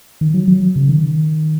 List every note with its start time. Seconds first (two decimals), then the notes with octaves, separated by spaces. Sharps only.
0.21 D#3
0.34 F#3
0.48 F#3
0.76 C#3
0.89 D#3